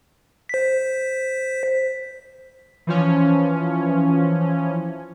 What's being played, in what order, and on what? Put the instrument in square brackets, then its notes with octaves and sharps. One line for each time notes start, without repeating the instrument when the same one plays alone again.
[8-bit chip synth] C5 B6
[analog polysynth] E3 F3 C#4